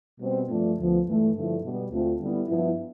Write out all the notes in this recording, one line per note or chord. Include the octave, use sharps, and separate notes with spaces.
B2 G3 C4
G2 F3 A3 D4 F4
D2 D3 F3 B3
G2 E3 A3
G2 D3 F3 A3 E4
B2 G3 B3
D2 D3 A3 C4 F4
D3 G3 B3 E4
G2 F3 B3 E4